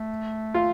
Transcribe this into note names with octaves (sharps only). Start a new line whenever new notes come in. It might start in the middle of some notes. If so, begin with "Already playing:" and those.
Already playing: A3
F4